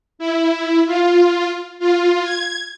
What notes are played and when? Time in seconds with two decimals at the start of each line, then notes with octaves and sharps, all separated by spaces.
0.19 E4
0.86 F4
1.79 F4
2.23 G#6